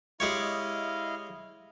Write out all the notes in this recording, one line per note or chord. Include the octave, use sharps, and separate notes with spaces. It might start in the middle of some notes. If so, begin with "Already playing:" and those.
G#3 E4 G4 C#5 D#5 F5